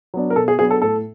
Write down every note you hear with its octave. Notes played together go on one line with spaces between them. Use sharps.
F#3 B3 D4
A#4
B2 A4
G#4
F#3 B3 D4 G#4
A4
A2 A4